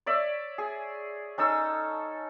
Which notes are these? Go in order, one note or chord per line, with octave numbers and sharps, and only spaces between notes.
C#5 D5 E5
G#4
C#4 D#4 A4 E6